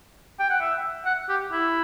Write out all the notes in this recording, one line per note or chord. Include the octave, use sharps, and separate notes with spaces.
G5
F#5
E5
F#5
G4
E4